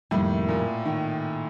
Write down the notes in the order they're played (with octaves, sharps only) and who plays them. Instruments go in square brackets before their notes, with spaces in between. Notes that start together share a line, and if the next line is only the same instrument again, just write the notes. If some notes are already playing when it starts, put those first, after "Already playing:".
[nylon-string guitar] F2 C3 D#3 G3 A#3 [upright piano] A2
[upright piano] A#2
D#3